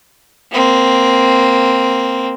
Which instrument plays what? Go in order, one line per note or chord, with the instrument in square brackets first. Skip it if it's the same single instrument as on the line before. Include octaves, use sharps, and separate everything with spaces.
[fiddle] A#3 C4